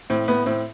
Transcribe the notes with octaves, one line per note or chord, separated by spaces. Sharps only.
A2 C4
A2 B3
A2 C4